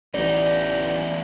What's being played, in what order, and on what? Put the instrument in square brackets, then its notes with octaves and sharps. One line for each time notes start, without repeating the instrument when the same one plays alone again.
[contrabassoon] A1 [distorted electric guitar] E2 D#4 [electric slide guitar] D5